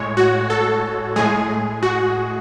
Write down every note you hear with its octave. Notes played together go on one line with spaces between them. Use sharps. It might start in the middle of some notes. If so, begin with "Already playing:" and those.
Already playing: A2 G#3 C#5
F#4
A4
A2 G#3 G#4
F#4